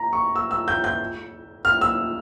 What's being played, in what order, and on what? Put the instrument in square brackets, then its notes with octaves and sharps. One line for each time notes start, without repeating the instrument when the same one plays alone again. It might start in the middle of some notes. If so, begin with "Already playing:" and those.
Already playing: [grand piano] A#5
C#6
E6
E6
G6
G6
F6
E6